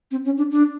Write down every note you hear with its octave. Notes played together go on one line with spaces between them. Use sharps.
C4
C#4
D4
D4